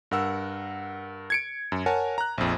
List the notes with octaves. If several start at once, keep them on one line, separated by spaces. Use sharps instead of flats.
G2 A#4 F#5 E6
G#6 C#7 D7
F#2
A#4 C#5 F#5 G#5 A5
A#5 F#6
A#1 F2